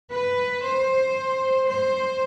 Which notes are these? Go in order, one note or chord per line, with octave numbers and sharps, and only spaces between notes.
B4
C5
C5